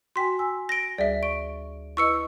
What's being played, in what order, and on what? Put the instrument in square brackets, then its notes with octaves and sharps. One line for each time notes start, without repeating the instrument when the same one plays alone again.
[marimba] F#4 G5 G#5 [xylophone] C6 B6
[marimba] G#5 E6
[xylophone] A#6 D7
[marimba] D2 G3 G#4 [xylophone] D5 E5
[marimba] C#6 [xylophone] D7
[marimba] E4 B4 D#5 [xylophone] C#6 E6 C#7